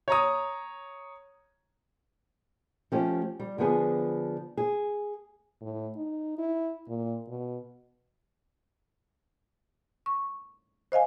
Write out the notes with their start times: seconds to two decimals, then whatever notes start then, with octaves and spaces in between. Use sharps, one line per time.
0.08 C#5 A#5 D#6
2.92 F3 A3 C#4 G4
3.40 G3
3.58 D3 F3 B3 G#4
4.57 G#4
5.62 A2
5.96 D#4
6.39 E4
6.88 A#2
7.28 B2
10.06 C#6
10.92 C5 D#5 F5 G#5